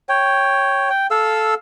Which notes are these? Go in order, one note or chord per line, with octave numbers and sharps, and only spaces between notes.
C#5 G5
G5
A4 F5 E6